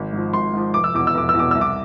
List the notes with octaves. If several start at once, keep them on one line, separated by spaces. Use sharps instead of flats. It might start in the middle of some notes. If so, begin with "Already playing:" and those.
Already playing: G#1
G#2 F3
G#1 C6
G#2 F3
F1 D6
E6
E2 B2 D6
E6
F1 D6
E6
E2 B2 D6
C2 E6
D6